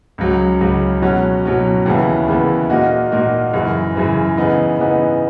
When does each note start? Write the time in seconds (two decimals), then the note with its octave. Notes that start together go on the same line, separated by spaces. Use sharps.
0.18 C#2 C#3 F#3
0.60 C#2 C#3 F#3
1.02 B2 F#3 C#4 F#4
1.44 B2 F#3 C#4 F#4
1.86 D#2 C#3 E3 B3 E4
2.28 D#2 C#3 E3 B3 E4
2.70 A#2 A#3 D#4 F#4
3.12 A#2 A#3 D#4 F#4
3.54 F#2 C#3 E3
3.96 F#2 C#3 E3
4.37 C#3 E3 B3 D#4
4.79 C#3 E3 B3 D#4